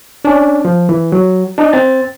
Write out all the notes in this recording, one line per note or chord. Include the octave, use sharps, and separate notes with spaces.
C#4 D4
F3
E3
F#3
D4 D#4 D#5
C4 A6